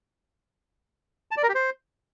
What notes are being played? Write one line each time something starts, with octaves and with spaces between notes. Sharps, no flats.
A5
D5
A#4
G4
C5